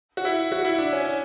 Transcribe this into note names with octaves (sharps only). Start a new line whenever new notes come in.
F#4
E4
F#4
E4
D4
C#4
C#4